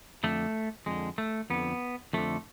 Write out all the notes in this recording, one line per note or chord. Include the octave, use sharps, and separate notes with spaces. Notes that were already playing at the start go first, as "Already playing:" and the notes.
F2 D3 A3
F2 D3 G#3
A3
F2 D3 B3
F2 D3 A3